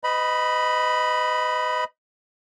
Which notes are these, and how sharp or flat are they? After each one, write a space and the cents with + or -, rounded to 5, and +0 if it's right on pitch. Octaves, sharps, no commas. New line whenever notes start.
B4 +45 D#5 +0 B5 -5